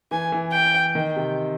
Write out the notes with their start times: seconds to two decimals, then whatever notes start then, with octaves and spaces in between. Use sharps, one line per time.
0.11 E3 G#5
0.32 E3
0.53 G5
0.95 D#3
1.16 C3